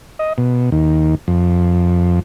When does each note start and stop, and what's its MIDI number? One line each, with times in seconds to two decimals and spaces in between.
0.19 0.33 75
0.38 0.70 47
0.72 1.15 39
1.28 2.20 41